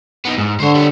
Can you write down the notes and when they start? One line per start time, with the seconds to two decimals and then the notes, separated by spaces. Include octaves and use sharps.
0.25 B3 D#4
0.38 G#2
0.60 D3 C5 C#5
0.75 G3 C#5